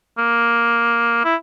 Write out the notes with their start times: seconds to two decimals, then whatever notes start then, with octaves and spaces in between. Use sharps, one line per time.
0.18 A#3
1.24 E4